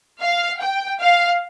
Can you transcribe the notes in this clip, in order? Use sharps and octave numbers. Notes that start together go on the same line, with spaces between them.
F5
G5
F5